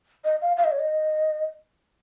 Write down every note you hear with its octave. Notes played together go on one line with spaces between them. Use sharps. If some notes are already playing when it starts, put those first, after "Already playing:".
D#5
F5
F5
D#5
C#5
D#5